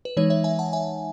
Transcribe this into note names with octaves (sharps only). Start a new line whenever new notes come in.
B4
E3 G#3 D#4 C#5
C#5 E5
E5 G#5
F#5 A5
E5 G#5